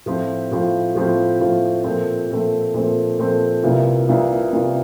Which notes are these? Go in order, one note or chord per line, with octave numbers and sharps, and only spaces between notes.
A2 F3 C4 F4
A2 F3 C4 F4
A2 F3 C4 F4
A2 F3 C4 F4
A#2 F3 A3 C4
A#2 F3 A3 C4
A#2 F3 A3 C4
A#2 F3 A3 C4
C2 C3 E3 A#3 F4
C2 C3 E3 A#3 F4
C2 C3 E3 A#3 F4